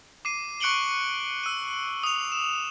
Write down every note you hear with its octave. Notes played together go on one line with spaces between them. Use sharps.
D6 C7 D#7
C#6 F#6 C#7 D7 F#7 G7
E6 D#7
D#6 F7
E7